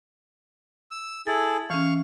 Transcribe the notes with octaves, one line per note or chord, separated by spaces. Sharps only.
E6
E4 G#4 A4 A6
E3 C#4 F5 C#6